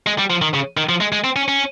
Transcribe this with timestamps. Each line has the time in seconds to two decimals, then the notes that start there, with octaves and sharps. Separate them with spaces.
0.07 G#3
0.19 G3
0.30 F3
0.42 D#3
0.54 C#3
0.77 D#3
0.89 F3
1.01 G#3
1.12 G#3
1.24 C4
1.36 C#4
1.48 C#4